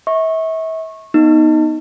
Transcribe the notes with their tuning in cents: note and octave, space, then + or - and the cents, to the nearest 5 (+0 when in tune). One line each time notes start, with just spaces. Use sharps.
E5 -35 C#6 -20
B3 -15 D#4 +0